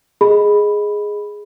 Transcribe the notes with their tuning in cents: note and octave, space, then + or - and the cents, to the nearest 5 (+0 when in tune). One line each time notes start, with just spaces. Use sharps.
G#4 +0 D#5 +0 B5 +0